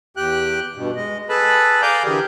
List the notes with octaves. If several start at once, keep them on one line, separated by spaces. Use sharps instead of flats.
E2 G4 G5 F#6
G2 B2
G#3 D#5
G#4 A4 B4 A5 B5
D5 F5 G#5 A#5 D6 G6
D3 E3 G4 G#4 A#4